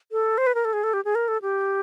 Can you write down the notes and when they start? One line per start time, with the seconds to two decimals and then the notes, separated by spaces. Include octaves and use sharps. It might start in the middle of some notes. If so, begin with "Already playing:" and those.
0.12 A4
0.38 C5
0.47 B4
0.55 A#4
0.65 A4
0.73 G#4
0.84 A4
0.93 G4
1.05 G#4
1.15 A#4
1.28 A4
1.42 G4